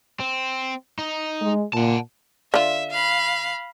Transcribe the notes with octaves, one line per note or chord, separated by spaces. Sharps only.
C4
D#4
G#3
A#2 F#5 A5
D3 F4 E5
F5 B5